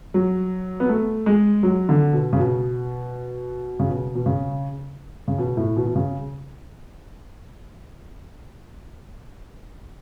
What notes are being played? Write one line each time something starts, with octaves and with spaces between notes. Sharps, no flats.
F#3
B3
A3
G#3
F#3
D3
B2
C#3
B2
C#3
B2
B2
C#3
C#3
B2
A2
B2
B2
C#3